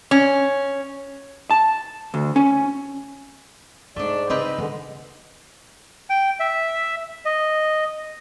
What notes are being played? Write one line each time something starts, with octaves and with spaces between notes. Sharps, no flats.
C#4
A5
D2
C#4
G#2 G#3 A3 D4 D5
C#3 C4 D#4 B4
D3 D#3 G#3 B3
G5
E5
D#5